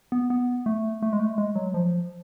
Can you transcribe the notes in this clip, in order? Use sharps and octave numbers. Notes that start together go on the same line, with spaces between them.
B3
B3
A3
A3
G#3
A3
G#3
F#3
F3